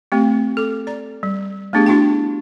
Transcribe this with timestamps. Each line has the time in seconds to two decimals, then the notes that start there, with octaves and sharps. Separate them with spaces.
0.12 A3 C4 G4
0.57 A4 D6
0.87 D5 A#5
1.23 G3
1.73 A3 B3 D4 G4 G#4
1.86 D4 E4 F#4 G4 G5 A5